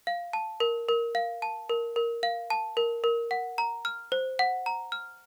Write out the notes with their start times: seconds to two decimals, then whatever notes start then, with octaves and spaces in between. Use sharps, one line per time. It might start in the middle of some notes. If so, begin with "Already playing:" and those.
0.07 F5
0.33 A5
0.60 A#4
0.89 A#4
1.15 F5
1.42 A5
1.70 A#4
1.96 A#4
2.23 F5
2.50 A5
2.77 A#4
3.04 A#4
3.31 F#5
3.58 A#5
3.85 F6
4.12 C5
4.39 F#5
4.66 A#5
4.92 F6